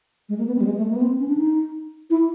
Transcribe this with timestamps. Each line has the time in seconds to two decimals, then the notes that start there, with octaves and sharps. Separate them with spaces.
0.29 G#3
0.38 A#3
0.47 B3
0.56 C4
0.60 G3
0.65 G#3
0.78 A3
0.89 A#3
0.96 B3
1.01 C4
1.19 C#4
1.28 D4
1.37 D#4
2.10 E4